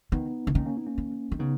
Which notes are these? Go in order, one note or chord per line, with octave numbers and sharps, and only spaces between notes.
D#3 B3 D#4
C#3
D#3 A#3 C#4
A#3 C#4
B3 D#4
A#3 C#4
D#3
D#3
C#3 B3 D#4